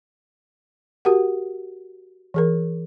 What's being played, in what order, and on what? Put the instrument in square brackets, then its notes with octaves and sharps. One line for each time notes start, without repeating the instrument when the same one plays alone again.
[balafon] F#4 G4 A#4 F#5
E3 G#4 A#4